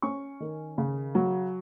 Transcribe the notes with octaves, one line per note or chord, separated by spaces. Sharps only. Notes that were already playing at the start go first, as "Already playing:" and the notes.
C#4 C#6
D#3
C#3
F#3